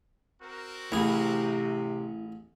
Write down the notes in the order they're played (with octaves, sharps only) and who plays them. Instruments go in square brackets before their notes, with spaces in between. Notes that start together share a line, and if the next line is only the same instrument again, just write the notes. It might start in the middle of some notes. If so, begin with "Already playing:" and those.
[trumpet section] C4 F#4 A#4
[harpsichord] A1 G#4 [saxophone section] C3 [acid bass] E4